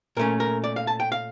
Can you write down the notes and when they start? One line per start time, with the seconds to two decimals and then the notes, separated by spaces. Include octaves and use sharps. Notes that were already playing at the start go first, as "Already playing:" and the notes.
0.17 A#2 A3 C#4 A#4
0.40 A#4
0.64 D5
0.76 F5
0.87 A5
1.00 G5
1.12 F5